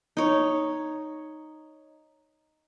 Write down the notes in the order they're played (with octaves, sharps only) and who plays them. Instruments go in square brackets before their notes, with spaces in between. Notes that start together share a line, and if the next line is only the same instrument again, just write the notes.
[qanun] D#4 C#5